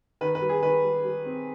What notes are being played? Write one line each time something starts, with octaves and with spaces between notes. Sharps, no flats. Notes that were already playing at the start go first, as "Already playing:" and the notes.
D#3 B4
B4
G3
G#4
D#3 B4
G3
G3
C4